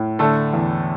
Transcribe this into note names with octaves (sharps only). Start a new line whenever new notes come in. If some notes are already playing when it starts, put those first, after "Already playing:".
Already playing: A2
D3 A3 A4
E2